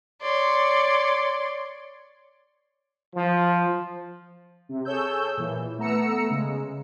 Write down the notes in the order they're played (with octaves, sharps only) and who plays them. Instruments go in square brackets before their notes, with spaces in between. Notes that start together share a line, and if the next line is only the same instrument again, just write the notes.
[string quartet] C#5 D5 C6
[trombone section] F3
[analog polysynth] C3
G#4 A4 C#5 E6 G6
A#2 E3
A3 B3 A#5 E6 C#7
C#3 G#3